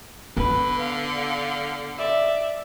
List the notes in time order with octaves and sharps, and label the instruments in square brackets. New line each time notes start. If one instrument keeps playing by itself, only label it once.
[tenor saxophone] D3 [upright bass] B3 [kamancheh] B4
[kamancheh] F5
D5 E5